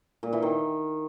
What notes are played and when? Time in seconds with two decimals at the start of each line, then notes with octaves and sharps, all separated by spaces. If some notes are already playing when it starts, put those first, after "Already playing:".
0.23 A#2
0.33 E3
0.42 D#3